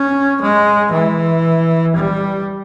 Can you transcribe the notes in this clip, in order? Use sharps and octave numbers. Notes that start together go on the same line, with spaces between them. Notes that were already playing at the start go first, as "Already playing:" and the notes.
Already playing: C#4
G#3
E3
G3